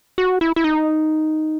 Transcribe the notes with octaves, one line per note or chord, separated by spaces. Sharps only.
F#4
E4
E4
D#4